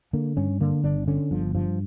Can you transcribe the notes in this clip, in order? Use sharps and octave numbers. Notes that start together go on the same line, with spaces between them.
D3 A#3
G2 C#4
D3 A#3
G1 D4
D3 C#4
G1 F3
G2 F3